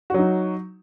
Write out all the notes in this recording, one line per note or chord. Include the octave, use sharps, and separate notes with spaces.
F#3 D#4 F#4